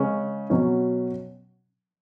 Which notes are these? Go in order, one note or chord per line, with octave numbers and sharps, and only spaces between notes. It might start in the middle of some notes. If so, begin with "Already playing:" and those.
Already playing: C#3 G#3 C#4
B2 F#3 C#4